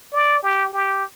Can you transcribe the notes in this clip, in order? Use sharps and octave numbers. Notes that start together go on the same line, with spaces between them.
D5
G4
G4